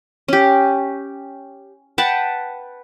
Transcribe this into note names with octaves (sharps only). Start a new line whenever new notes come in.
C#4 G4
B4 F#5 G5 A5